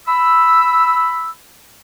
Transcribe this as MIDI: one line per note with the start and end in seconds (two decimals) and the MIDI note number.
0.07 1.31 83
0.07 1.31 88